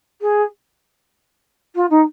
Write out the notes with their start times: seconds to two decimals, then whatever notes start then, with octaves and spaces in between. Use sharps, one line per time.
0.21 G#4
1.75 F4
1.90 D#4